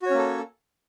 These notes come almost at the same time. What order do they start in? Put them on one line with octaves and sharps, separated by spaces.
F#4 C#5 C#4 A#3 A4